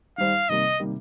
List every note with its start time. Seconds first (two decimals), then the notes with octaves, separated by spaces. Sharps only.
0.18 D#3 G3 D#4 C5 F5
0.49 C3 D#3 G3 A#3 D#5
0.80 C3 D#3 G3 A#3